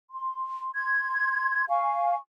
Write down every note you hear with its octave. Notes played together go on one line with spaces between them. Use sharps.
C6
C6 G#6
F5 G#5 C#6